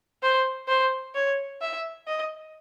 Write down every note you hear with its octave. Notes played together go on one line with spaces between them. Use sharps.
C5
C5
C#5
E5
D#5